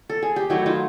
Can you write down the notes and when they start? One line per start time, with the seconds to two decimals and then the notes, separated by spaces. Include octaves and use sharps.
0.10 A4
0.22 G#4
0.36 G4
0.50 D#3 F#3 A3 E4 F#4
0.66 D#4 F4